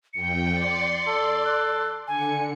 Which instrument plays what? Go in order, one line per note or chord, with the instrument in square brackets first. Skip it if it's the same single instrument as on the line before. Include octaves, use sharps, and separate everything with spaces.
[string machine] F2 G5 [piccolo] C#7
[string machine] D5 C6
[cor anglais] A4
[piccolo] F#6
[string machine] D3 C#7 [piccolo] G#5